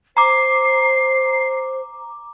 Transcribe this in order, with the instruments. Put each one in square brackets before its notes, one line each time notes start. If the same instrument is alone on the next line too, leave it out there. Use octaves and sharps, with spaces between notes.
[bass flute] C5 [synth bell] A#5 D6 [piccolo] C7